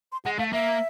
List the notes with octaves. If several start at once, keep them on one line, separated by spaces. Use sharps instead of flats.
C6
G#3 F#5
A3 F5
A#3 E5